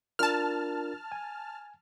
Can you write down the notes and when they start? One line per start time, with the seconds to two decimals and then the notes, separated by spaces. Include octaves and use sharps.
0.19 D4 F4 A#4 A5 F6
1.12 G#5